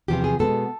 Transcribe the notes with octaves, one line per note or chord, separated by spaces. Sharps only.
E2 C3 F3 G4
G#4
B2 G#3 B3 A4